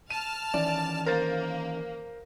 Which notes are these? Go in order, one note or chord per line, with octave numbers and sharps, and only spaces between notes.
A5 F6 D#7
D#3 E3 C#4 D5
A#3 A#4 C5 A6